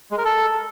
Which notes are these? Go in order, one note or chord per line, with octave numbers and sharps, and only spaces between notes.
G#3
A#4
A4